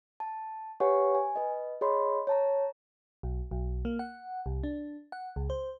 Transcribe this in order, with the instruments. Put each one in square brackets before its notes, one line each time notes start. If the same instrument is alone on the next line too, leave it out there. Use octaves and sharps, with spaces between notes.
[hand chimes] A5
G4 B4 C#5 F#5 G#5 C#6
G#5
B4 D#5
G#4 C#5 D#5 B5 C6
C#5 A5 A#5
[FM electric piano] B1
B1
A#3
F#5
C2
D4
F#5
C#2
C5